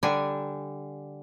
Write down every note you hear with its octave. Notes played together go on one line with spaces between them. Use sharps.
D3 G3 D4 G#5